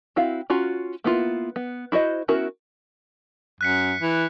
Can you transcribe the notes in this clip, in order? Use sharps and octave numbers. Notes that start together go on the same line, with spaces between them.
C4 E4 F#4 F5
C#4 F4 F#4 A#5
A#3 B3 E4 F4
B3
E4 F#4 C5 D#5
B3 C#4 E4 F#4 A#4
F#2 F#6 B6 C#7
E3